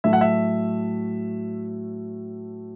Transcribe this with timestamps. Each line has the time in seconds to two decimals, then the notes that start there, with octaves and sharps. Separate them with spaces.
0.04 A2 F#3 A3 E5
0.13 F#5
0.21 E5